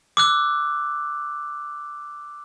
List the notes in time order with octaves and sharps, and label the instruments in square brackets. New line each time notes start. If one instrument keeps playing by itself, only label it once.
[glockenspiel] D6 E6 F#6